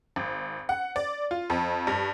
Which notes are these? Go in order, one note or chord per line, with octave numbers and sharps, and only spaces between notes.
G#1
F#5
D5
F4
F2
G2